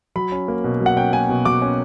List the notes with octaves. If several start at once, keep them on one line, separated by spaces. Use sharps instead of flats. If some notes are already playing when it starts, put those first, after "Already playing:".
F#3 B5
C#4
A#3
B2
F#3
F#5
C#4 G5
A#3 G#5
B2
F#3 D6
C#4